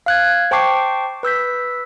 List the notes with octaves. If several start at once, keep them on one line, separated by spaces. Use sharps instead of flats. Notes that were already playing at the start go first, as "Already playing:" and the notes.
F5 F#6 G#6
C5 G5 A5 C#6 D6 C7
B4 E6 G6 B6